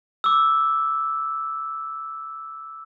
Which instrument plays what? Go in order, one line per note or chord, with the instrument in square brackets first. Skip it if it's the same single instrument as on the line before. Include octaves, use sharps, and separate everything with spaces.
[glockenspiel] D6 E6